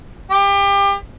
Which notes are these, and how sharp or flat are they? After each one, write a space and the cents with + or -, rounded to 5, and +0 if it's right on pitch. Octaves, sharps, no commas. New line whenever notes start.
G4 +30